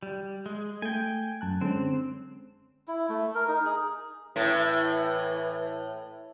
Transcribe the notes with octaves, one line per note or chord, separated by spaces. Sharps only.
G3
G#3
A3 G5 G#5
F#2 A5 F#6
D3 G#3 C4 C#4
E4
A3
A#4
D#4
G#4
A2 E3